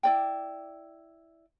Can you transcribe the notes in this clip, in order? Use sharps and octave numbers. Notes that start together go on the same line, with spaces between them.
E4 D5 G5